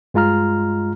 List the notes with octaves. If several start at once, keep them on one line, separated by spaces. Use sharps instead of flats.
G2 G#3 F4 A#5 F6